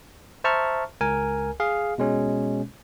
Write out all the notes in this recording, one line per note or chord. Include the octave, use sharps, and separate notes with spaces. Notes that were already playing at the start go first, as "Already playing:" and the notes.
C5 E5 A5 A#5 C#6 F6
C#2 A#4 G#5
G#4 F5
B2 G#3 C#4